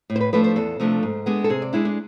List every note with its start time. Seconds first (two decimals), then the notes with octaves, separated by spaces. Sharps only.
0.10 A2
0.16 C5
0.21 B4
0.33 F3 A3 D4 B4
0.44 C5
0.56 E2 A4
0.80 C3 F3 A3 D4
1.03 G#2
1.26 G#3 B3 D4
1.44 A4
1.50 C3 G#4
1.62 D5
1.73 G#3 D4 E4
1.85 D4